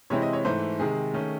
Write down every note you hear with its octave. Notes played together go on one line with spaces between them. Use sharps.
C3 E3 G#3 C4 E4 C#5
D#5
C#5
G#2 E3 A3 C5
C3 D#3 G#3 G#4
D#3 A3 C#4